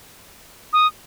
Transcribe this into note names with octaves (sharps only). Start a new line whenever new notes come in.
D#6